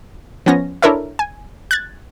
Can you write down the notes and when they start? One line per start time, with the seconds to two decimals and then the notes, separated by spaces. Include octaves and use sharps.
0.46 F3 B3 C#4 A#6
0.82 D4 E4 A4 A#4 C#5 E5
1.19 G#5
1.71 F#6 G#6 A6